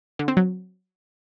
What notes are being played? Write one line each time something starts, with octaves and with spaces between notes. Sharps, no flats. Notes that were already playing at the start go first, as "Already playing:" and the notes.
D3
C4
F#3